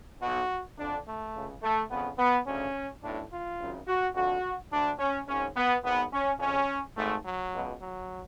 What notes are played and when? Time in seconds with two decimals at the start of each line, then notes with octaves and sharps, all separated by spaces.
0.21 B1 B2 F#4
0.77 F2 D3 D4
1.06 A3
1.34 C#2 C#3
1.62 A3
1.89 F2 C#3 B3
2.18 B3
2.46 D2 C#3 C#4
3.02 B1 A2 D4
3.31 F4
3.59 G#1 F#2 C#3
3.87 F#4
4.15 F2 D3 F#4
4.71 D2 D3 D4
4.99 C#4
5.27 G#1 G#2 C#4
5.55 B3
5.84 G#1 G#2 B3
6.12 C#4
6.39 F2 C#3 C#4
6.96 G#1 G#2 A3
7.24 F#3
7.53 C#2 B2
7.81 F#3